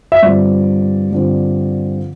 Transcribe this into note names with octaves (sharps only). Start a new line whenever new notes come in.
E5
G2 D3 F3 C4 D5
G2 D3 F3 C4